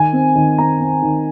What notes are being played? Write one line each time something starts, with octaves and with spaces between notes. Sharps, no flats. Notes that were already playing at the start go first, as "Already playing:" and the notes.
Already playing: D#3 G#5
C4
D#3
C4 A#5
C4
D#3